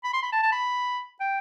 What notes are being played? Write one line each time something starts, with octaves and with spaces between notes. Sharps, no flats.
B5
C6
B5
A5
A5
B5
G5